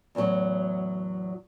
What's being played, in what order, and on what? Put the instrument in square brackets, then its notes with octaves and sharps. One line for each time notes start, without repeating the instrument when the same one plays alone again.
[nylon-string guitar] E2 A2 D#3 F#3